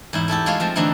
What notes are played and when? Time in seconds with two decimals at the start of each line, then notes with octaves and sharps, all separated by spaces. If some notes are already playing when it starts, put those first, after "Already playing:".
0.13 E2 G#2 E4
0.28 A3 E4 G4 A4
0.46 G#3 F4 C#5 E5 F5
0.60 F3 A3 C4
0.76 D3 E3 A3 C4 D#4 E4